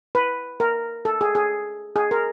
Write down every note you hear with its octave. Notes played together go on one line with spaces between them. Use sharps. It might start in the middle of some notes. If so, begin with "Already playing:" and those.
B4
A#4
A4
G#4
G#4
G#4
A#4